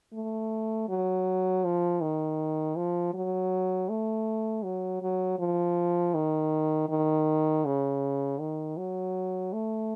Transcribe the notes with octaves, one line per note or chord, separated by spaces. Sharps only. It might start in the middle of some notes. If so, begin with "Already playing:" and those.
A3
F#3
F3
D#3
F3
F#3
A3
F#3
F#3
F3
D#3
D#3
C#3
D#3
F#3
A3